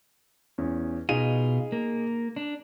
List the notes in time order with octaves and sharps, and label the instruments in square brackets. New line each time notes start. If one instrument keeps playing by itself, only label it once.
[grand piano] E2 C#4
[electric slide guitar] B2 F4 [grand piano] D#4 G#4 D#7
[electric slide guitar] A#3
D4